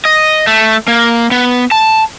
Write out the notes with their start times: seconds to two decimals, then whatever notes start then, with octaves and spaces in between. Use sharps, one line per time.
0.05 D#5
0.47 A3
0.88 A#3
1.31 B3
1.71 A5